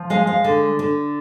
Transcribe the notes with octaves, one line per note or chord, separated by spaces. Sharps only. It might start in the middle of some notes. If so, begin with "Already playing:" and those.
Already playing: F3
G#3 F5
F5
D3
D3